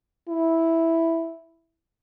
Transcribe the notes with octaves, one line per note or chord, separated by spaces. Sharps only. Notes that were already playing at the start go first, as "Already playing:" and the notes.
E4